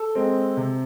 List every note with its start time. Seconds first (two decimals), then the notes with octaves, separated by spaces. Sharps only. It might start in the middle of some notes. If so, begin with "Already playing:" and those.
Already playing: A4
0.15 G#3 C4
0.57 C3